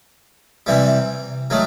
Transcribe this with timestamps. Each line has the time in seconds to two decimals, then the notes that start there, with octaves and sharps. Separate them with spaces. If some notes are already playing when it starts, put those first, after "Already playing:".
0.67 C3 E3 G3
1.50 D#3 F#3 A3